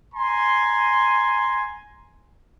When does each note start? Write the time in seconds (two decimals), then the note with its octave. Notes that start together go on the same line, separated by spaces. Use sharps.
0.13 G#5 A#5 C6